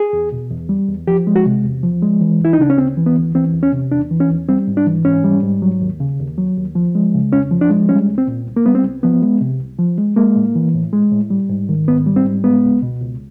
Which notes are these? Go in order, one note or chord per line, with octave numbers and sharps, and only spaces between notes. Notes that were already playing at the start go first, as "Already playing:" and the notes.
Already playing: G#4
E2
B2
E2
G3
E2
F3 G4
G#3
F#4
C3
E2
F3
G#3
E3
D2 E4
D#4
C#3 D4
C#4
D2 C4
E3
B3
D2
E3 C4
E2
C#4
C3
E2 D4
E3
C#4
E2
G3 C4
G#2
D4
E3
G#2 C#4
G3
G#2
F#3
D#2
C#3
D#2
F#3
D#2
F3
G#3
C#3
F2 C#4
F3
D4
G#3
G3 C#4
C2
C4
A#2
C2
A#3
G3 B3
C4
C2
F3 B3
G#3
C3
C2
F3
G#3
G#3 A#3
A2
E3
A2
G#3
A2
G3
G#2
D#3
G#2 B3
G3
C4
G#2
G#3 B3
C#2
B2
C#2